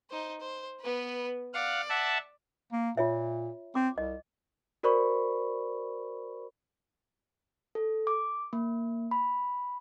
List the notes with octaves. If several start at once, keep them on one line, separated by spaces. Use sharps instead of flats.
D#4 C5
C5
B3 B4
D5 F5 F#5
E5 F#5 A5
A#3
A#2 F4 C#5 E5
C4 D6
C2 D#5
F#4 A#4 C5 D5 B5 C#6
A4
D6
A#3
B5